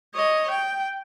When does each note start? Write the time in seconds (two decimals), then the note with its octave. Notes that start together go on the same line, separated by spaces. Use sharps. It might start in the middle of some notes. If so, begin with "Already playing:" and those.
0.14 C#5 D#5
0.50 G5